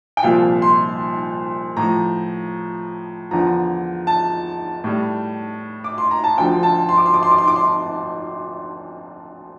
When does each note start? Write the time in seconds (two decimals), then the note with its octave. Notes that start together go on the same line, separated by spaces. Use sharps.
0.17 G5
0.23 C2 A#2 F3 F5
0.62 C6
1.76 A2 F3 A#5
3.31 E2 D3 F3 A#5
4.07 A5
4.84 A2 G3
5.84 D6
5.98 C6
6.11 A#5
6.24 A5
6.38 D2 D3 F3 G5
6.63 A5
6.89 C6
6.98 D6
7.06 C6
7.14 D6
7.23 C6
7.31 D6
7.38 C6
7.48 D6
7.56 C6